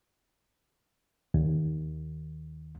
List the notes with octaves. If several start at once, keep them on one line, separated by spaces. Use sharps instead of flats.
D#2